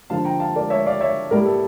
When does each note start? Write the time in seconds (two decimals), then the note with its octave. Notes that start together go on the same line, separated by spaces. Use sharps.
0.10 D3 F3 A#3 F5 A5
0.25 G5 A#5
0.40 F5 A5
0.56 A#4 D5
0.70 C#5 E5
0.86 D5 F5
1.01 C#5 E5
1.31 A2 G3 A#3 A#4
1.46 A4